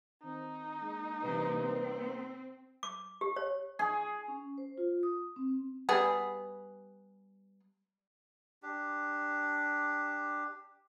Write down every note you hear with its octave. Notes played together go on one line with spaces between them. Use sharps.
D#3 C4 D#4
G#3 A#3
C3 E3 G3 A#3 C4 A#4 B4
C4
D6
G4
C#5
G#4
C#4
C5
F4
D#6
C4
G3 B3 G#4
D4 G4